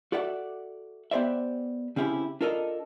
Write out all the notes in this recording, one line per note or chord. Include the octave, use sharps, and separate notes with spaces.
F#4 A4 D5 E5 F#5
B3 G4 C5 D5 E5
C#3 C4 C#4 E4 F#4 G4
D4 F4 A4 A#4 C#5 D#5